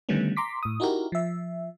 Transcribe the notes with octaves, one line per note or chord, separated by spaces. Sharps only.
D3 D#3 G3 A3 B3 C#4
A#5 C6 D6 B6
A2 D#6
D#4 E4 F#4 G4 A#4
F3 E5